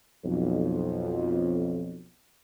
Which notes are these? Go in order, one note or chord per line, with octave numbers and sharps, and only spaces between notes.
B1 F2